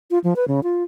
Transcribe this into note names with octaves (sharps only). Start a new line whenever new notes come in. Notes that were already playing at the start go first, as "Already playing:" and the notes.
F4
F3
B4
C#3
F4